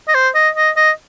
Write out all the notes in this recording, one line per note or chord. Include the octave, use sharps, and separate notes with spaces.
D#5
C5
D#5
D#5
D#5